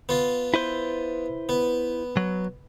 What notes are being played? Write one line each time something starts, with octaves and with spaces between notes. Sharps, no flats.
B3 F4
E4 B4 C5
B3
F#3